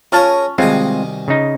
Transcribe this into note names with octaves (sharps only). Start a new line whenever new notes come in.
C#4 F4 G#4 A#4 C#5 A5
C2 B2 D#3 G#3 C4 F4 G#4
C#3 D#4